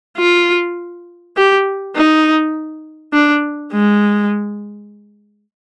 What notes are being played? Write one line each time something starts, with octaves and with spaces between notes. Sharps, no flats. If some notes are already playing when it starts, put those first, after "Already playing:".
F4
G4
D#4
D4
G#3